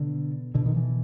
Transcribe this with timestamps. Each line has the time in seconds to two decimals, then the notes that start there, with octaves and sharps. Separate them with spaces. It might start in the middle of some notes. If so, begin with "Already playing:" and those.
Already playing: B2 D3
0.55 B2 D3
0.66 D#3
0.76 E3